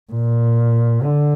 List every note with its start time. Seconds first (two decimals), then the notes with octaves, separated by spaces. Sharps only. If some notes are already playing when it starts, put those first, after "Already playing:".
0.13 A#2
1.04 D3